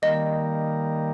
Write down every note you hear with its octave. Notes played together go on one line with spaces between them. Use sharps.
D#3 G3 A#3 D#5